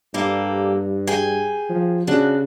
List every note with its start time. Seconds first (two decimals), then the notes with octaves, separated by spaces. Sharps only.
0.14 G2 G3 A#3 A4
1.07 G#4 G5 G#5
1.69 F3
2.07 C#3 D4 F#4